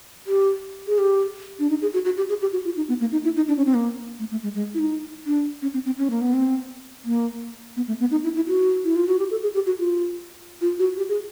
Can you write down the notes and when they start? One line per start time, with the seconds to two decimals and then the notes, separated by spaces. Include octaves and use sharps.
0.27 G4
0.87 G#4
0.98 G4
1.59 D4
1.70 D#4
1.82 G#4
1.94 F#4
2.05 F#4
2.17 G4
2.29 G#4
2.41 G4
2.53 F#4
2.65 F4
2.77 D#4
2.89 B3
3.01 A#3
3.12 D#4
3.24 E4
3.36 D#4
3.48 D4
3.57 C#4
3.66 C4
3.74 A#3
4.19 A3
4.31 A3
4.43 G#3
4.55 G#3
4.74 E4
4.79 D#4
5.26 D4
5.62 C#4
5.74 C4
5.86 C4
5.98 C#4
6.10 A#3
6.21 B3
6.33 C4
7.05 A#3
7.76 B3
7.88 A3
8.00 B3
8.11 D#4
8.24 E4
8.36 E4
8.48 F#4
8.85 E4
8.96 F4
9.07 F#4
9.19 G4
9.31 A4
9.43 G#4
9.55 G4
9.66 F#4
9.78 F4
10.61 F4
10.79 F#4
10.97 G4
11.09 G#4